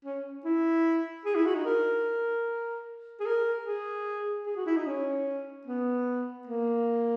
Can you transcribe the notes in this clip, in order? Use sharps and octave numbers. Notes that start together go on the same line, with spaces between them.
C#4
E4
G#4
E4
F#4
D#4
A#4
G#4
A#4
G#4
G#4
F#4
E4
D#4
C#4
B3
A#3